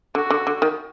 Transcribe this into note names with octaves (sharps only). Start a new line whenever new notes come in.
D3 F#4
D3
D3
D#3